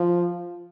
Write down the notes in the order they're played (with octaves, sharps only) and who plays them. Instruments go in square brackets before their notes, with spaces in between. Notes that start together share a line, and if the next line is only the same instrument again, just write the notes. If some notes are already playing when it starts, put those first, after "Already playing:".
Already playing: [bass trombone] F3